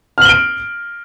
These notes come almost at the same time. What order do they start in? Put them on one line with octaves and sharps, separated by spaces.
F6 F#7 G7 D7